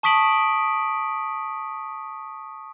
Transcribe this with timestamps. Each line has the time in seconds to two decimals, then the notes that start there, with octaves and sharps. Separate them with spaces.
0.03 A5 C#6 D#6 B6 D7 F#7